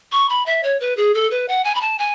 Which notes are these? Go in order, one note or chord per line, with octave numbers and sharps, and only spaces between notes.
C#6
B5
E5
C#5
B4
G#4
A4
B4
F#5
G#5
B5
A5
G#5